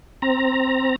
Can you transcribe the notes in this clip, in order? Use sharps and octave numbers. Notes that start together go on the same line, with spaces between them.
C4 A#5